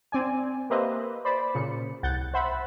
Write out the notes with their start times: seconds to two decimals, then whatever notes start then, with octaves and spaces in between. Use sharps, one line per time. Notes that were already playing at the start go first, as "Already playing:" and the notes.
0.12 C4 D5 G#5
0.70 A#3 G4 B4 C5 D#5 E5
1.25 C5 D5 B5
1.54 A#2 C#3 C#7
2.03 C2 F#5 G6 A6
2.34 C5 E5 F#5 B5